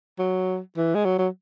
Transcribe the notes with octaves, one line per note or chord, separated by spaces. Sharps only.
F#3
E3
G#3
F#3
F#3